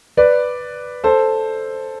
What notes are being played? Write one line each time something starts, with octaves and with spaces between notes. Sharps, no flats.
B4 D5
A4 C5